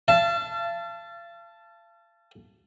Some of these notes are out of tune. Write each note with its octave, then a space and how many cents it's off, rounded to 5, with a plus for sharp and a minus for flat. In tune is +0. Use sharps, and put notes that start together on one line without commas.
F5 -40 A5 +0